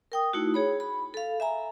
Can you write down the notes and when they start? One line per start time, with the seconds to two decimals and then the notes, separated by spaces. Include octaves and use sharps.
0.12 A#4 G5 D#6
0.33 A3 D#4 E4 F#4
0.54 G#4 C#5 B5
0.80 B5
1.14 A4 F5
1.40 E5 G#5 A#5